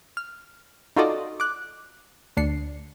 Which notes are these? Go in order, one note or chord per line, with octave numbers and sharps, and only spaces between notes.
F6
D#4 F4 F#4 A4 D5 D#5
D6 F#6
D2 D4 C7 C#7